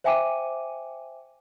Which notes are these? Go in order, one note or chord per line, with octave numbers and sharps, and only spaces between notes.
C5 E5 G5 G#5 D6 D#7